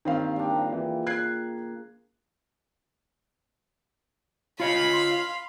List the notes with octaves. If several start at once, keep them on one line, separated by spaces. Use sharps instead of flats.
G2 D#3 A#3 C4 F5 B5
G3 D4
C#3 F3 A#3
E3
F#6 G#6 C7
F4 C#5 D#5 F5 B5
C6